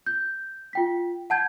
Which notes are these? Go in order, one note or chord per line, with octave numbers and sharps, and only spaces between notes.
G6
F4 G5 B6
F#5 A5 G6 G#6